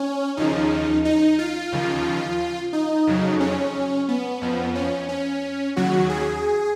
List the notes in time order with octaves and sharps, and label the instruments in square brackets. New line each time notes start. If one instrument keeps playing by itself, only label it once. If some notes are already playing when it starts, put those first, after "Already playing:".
Already playing: [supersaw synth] C#4
D#2 C#3 F3 D#4
D#4
F4
D#2 C#3 F3
D#4
F2 C#3 F#3
C#4
B3
F2 F3
C#4
C#4
D#2 C#3 F#3 F#4
G#4